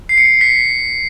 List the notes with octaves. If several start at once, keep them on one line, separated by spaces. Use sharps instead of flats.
C7
C#7
C7
B6